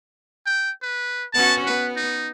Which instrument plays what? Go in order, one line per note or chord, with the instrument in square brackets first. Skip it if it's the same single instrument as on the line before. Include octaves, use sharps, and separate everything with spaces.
[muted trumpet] G5
B4
[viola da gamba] B3 C#4 F#4 [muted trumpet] A5
[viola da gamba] B3 [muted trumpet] B4
[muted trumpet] D#4